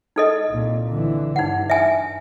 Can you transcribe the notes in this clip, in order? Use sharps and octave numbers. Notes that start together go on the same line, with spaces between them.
D#4 A4 D#5
C2 A#2
D3 E3
G2 D#4 F#5
E5 G#5